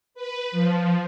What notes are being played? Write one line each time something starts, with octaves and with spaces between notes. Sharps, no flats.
B4
F3